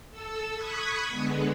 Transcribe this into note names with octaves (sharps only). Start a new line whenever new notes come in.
A4 E6
B5 C#6 D#6 F#6 G#6 B6
D3 G#3 B3